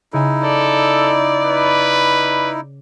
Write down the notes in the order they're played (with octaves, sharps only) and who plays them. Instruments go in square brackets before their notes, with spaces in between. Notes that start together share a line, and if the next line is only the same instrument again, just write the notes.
[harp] C#3 G#5 [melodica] D#4 E4
[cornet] A4 [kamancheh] D5
[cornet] B4